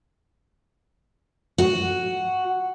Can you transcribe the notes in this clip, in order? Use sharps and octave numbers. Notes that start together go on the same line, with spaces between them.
F#4